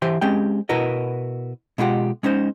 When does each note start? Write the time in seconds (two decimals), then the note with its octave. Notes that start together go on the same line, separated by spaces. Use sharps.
0.02 E3 G4 C5 E5 C6
0.21 G#3 C4 C#4 G4 G5
0.69 B2 E4 F#4 A#4 B4 D#5
1.78 B2 G#3 E4 F4 G4 F#5
2.23 G#3 C#4 D#4 C5